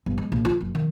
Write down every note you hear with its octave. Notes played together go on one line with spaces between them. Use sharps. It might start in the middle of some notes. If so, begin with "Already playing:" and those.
G1
G#3
A#1
F4
F#1
D#3